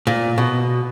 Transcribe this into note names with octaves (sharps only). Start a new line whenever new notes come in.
A#2
B2